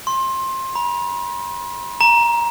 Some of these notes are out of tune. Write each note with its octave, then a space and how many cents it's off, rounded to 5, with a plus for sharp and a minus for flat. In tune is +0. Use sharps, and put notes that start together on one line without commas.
C6 +20
B5 -40
A#5 +15